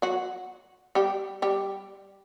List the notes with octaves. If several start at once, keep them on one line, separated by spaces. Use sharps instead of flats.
F#3 F#4
G3 G4
G3 G4